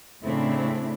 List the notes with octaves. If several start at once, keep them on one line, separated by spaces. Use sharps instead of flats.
A2 C#3 A3 C4 D4 E4